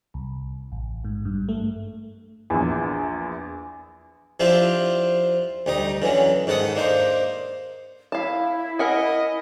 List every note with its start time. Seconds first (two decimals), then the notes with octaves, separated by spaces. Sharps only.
0.14 C2
0.72 A1
1.04 G#2
1.25 G2
1.49 A3
2.50 A#1 E2
4.40 F3 C4 D4 E4 F4 G4
5.66 D2 G3 D#4 D#5
6.02 D3 E3 F#3 C#4
6.47 G#2 D#3 A4 F#5 D#6
6.75 A#3 D4 D#4 C5
8.12 E4 F5 A5
8.79 A#4 D#5 F#5 G#5